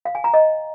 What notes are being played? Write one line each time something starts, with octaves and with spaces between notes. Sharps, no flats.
F5
G#5
A#5
D#5